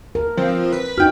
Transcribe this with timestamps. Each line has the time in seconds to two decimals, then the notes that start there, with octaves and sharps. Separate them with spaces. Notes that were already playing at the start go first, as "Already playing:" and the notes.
0.15 A#4
0.37 F3 C4
0.72 B4
0.98 D4 D#4 F#4 G5 F6